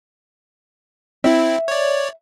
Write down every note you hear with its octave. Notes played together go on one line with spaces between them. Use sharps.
C4 E4 E5
C#5 D5